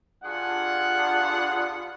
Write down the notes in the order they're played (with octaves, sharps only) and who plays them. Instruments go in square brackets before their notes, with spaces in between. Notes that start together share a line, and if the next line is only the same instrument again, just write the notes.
[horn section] G2 D4 F4 G#4 F#5